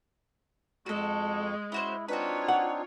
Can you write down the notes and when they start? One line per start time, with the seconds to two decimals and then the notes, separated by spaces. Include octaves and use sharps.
0.86 F2 G#3 F#4 A4 C#6
1.72 C#4 E4 F#4 C5
2.08 C4 D4 D#4 F4 F#4 B4 C#5
2.48 F#5